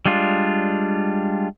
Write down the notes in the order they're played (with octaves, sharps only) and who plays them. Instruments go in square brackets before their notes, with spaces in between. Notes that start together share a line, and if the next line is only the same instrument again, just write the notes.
[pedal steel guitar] G3 G#3 D4 F4